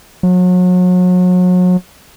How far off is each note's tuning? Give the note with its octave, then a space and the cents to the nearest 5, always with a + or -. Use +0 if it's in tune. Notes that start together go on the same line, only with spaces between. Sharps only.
F#3 -35